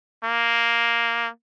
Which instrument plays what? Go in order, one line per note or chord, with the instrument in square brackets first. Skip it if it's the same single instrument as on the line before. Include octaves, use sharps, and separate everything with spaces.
[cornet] A#3